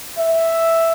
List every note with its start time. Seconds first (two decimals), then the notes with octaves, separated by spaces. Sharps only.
0.18 E5